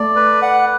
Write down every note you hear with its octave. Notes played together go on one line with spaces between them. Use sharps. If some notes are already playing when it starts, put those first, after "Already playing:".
Already playing: A3 D5
B4
F#5